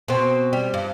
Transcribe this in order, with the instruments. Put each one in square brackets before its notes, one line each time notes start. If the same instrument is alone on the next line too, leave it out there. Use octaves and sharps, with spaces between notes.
[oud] B2 C4
G3
G2